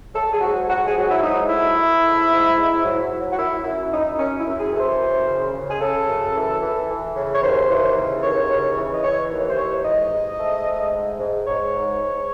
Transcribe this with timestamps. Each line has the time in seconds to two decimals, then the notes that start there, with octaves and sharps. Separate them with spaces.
0.14 F#3 A4
0.33 G#4
0.41 G#2 F#4
0.68 G#2 F#4
0.87 G#4
0.96 F#3 F#4
1.11 E4
1.23 G#2 D#4
1.49 A3 E4
1.76 A3
2.03 G#2
2.30 G#2
2.57 G#2
2.84 F#3
3.11 F#3
3.32 F#4
3.37 F#2 E4
3.64 F#2 E4
3.91 F#2 D#4
4.18 F#2 C#4
4.39 E4
4.46 F#2
4.59 G#4
4.72 E3 A4
4.79 C5
4.99 F#2
5.26 C#3
5.54 C#3
5.69 G#4
5.80 C#3 A4
6.07 F#2
6.34 E3
6.61 E3
6.88 E3
7.15 C#3
7.34 C#5
7.42 D#2 C5
7.69 E3
7.96 C#3
8.23 D#2 C#5
8.50 C#3
8.77 E3
8.94 D#5
9.04 E3 C#5
9.31 D#2
9.49 C5
9.57 E3 C#5
9.84 G#2 D#5
10.12 G#2
10.39 A3
10.66 G#2
10.92 G#2
11.19 G#2
11.46 G#2 C#5
11.73 G#2
12.00 G#2